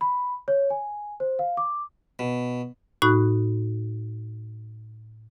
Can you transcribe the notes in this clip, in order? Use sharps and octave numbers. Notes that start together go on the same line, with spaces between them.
B5
C#5
G#5
C5
F5
D6
B2
A2 D#4 F#4 B5 F#6